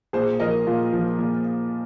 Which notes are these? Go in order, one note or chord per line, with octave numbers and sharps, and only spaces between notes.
A#2 G#4 C5
F3 A#4 D#5
A#2 F4
F3
A#2